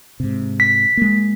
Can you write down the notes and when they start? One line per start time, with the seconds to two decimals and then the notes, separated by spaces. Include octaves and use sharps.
0.20 G#2 C3
0.60 B6
0.97 G#3 A#3